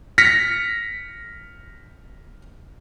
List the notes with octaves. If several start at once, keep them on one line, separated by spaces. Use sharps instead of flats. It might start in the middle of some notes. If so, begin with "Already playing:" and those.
F6 A#6 B6 C#7